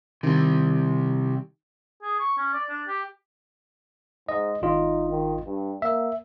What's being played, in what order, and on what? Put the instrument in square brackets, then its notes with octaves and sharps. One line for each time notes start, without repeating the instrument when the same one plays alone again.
[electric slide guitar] C3 G3 [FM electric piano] D#3
[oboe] G#4
C#6
C#4
D5
D4
G4
[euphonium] G#2 [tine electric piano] D#5
[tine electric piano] G#1 F4 D#5 [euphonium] D#4
[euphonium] D#3
G2
[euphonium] A#3 [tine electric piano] E5